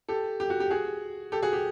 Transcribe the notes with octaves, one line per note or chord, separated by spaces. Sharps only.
G4 A4
G4
F#4
G4
F#4 G#4
G4 A4
F#4 G#4
G4